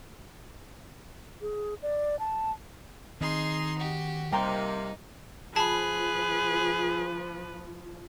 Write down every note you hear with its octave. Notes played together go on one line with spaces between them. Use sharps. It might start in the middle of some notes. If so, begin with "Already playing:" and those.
G#4
D5
A5
D#3 C4 D#4 G#4 C6
F#4 G4
C3 G3 A#3 D#4 G5 A#5 C6
F3 G#4 B4 A5 B5